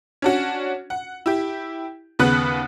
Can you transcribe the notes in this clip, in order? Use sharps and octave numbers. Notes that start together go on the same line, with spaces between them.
C#4 D4 F#4
F#5
E4 G4
D#2 C#3 B3 B4 F#5 F#6